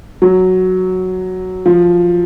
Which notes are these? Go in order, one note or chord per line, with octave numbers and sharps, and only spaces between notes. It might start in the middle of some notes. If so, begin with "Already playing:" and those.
F#3
F3